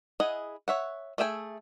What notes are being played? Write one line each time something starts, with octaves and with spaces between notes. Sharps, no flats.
E4 G#4 D#5 F#5
C#5 E5 F#5
A3 G#4 E5 G5 G#5